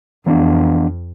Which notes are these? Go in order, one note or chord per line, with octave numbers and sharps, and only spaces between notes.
F2 E3 B3 D4